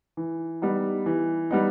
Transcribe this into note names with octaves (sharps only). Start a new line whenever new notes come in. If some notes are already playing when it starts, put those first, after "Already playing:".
E3
G3 B3 D#4
E3
G3 B3 D#4